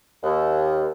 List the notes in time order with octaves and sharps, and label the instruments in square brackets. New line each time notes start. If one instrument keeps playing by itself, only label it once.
[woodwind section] D#2